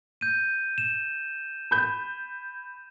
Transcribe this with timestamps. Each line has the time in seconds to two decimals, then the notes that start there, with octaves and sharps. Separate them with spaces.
0.21 G6 D#7
0.78 E7
1.71 B5 G6